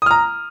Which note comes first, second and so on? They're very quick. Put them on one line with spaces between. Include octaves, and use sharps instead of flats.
D#6 F6 A#5